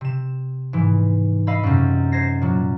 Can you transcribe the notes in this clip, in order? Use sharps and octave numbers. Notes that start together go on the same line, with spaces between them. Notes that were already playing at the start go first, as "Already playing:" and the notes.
C3 E7
G#2 E3
D#5 F5 B5 E6
F#2 C3
C5 G#6 A#6 C7
A#2 F#3